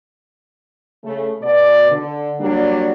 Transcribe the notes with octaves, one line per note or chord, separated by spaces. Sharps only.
C#3 A3
B2 D5
D3
F#3 G3 A#3 D4